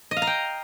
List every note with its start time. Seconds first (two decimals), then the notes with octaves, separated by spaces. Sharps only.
0.11 D#5
0.17 F5
0.22 A#5
0.27 G5